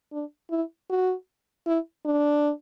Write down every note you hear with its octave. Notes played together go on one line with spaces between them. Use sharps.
D4
E4
F#4
E4
D4